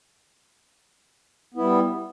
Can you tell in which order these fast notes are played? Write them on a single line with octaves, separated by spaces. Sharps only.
B3 E4 G3